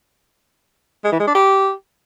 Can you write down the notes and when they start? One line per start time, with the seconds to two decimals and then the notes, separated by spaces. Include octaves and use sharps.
1.04 G#3
1.12 E3
1.20 G#3
1.27 D4
1.35 G4